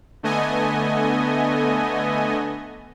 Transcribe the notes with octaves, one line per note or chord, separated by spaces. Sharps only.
D3 A3 B3 D#5 G#5